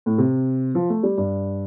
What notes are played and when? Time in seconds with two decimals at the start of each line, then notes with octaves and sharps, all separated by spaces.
0.06 A2
0.18 C3
0.75 F3
0.89 A3
1.03 G3
1.18 G2